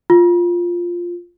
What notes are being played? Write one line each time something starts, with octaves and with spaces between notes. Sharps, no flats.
F4